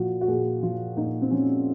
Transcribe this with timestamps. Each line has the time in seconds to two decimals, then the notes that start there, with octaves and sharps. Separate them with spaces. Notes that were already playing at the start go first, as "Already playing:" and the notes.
Already playing: A#2 F3 F4 F#4
0.21 F#4
0.28 A#2 G#4
0.63 F3 F4
0.97 A#2 D#4
1.22 C4
1.31 F3 C#4